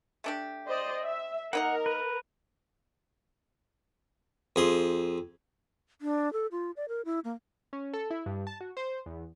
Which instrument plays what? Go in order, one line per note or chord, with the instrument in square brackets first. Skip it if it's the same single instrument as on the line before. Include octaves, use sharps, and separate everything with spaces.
[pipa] A3 D4 G4
[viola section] C5 D5 D#5
E5
[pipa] A#3 D#4 D#5 [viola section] A#4 [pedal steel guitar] F#5
[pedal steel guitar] B4
[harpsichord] F2 G#4 C6
[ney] D4
A4
F4
D5
A#4
E4
A#3
[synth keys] C#4
A4
E4
G2
A5
F#4
C5
E2